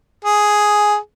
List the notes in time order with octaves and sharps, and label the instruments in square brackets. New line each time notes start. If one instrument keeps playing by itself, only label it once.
[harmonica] G#4